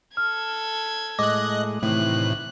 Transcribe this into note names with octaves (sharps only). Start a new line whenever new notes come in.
A4 F6 G#6
A2 G#3 D#5 D6 F#6
A2 C3 D#3 E3 F#6